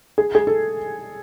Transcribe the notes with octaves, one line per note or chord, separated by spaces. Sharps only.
G#4
G#4
A4